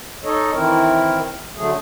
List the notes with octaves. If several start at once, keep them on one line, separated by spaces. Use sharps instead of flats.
D#4 A4 C#5 D#5
D#3 E3 C4 E4 A#4
D3 F#3 A3 G#4